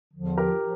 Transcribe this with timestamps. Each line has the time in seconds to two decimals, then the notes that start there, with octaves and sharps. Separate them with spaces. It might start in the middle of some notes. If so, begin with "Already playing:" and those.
0.14 E2 D3 F3
0.38 G4 A#4
0.60 F3